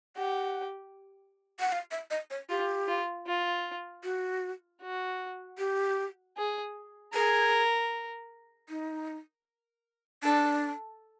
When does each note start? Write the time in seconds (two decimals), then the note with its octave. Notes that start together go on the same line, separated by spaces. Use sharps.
0.17 G4 F#5
1.60 F#5
1.72 F5
1.91 E5
2.11 D#5
2.31 C#5
2.50 F4 G4
2.88 F4
3.27 F4
4.04 F#4
4.82 F#4
5.58 G4
6.37 G#4
7.14 G#4 A#4
8.69 D#4
10.23 D4 A4